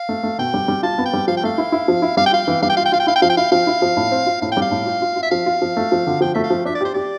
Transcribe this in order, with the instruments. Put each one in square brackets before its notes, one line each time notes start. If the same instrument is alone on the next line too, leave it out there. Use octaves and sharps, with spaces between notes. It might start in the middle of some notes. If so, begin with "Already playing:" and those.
Already playing: [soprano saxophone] F5
[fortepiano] A3
A3
[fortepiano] B2 [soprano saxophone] G5
[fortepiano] G3
G3
[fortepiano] F4 [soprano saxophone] A5
[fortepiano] B3
[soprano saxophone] G5
[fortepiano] G3
[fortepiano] F3 [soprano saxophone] F5
[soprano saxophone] G5
[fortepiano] A3 [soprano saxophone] F5
[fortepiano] E4
E4
F3
E4
[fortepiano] G3 [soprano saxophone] F5
[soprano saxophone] G5
[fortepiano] F4 [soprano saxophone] F5
[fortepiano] E3
[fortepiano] G3 [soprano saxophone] F5
[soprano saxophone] G5
[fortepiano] F4 [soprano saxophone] F5
[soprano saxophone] G5
[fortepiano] F4 [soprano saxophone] F5
[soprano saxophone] G5
[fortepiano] E4 [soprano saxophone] F5
[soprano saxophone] G5
[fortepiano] F3 [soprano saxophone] F5
[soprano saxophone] G5
[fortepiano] E4 [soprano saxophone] F5
[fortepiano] F3 [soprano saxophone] F5
[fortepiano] E4
F3
A2
C4
F4
[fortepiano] A2 [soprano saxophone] F5
[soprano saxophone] G5
[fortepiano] G3 [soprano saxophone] F5
[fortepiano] A2
F4
F4
F4
[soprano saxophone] E5
[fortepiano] F3 [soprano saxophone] F5
[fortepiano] F4
F3
A3
F3
D3
[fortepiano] F3 [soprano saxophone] G5
[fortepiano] A3 [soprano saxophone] E5
[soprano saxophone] F5
[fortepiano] F3
[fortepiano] D4 [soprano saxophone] E5
[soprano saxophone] D5
[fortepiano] G4 [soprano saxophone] C5
[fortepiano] G4 [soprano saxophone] D5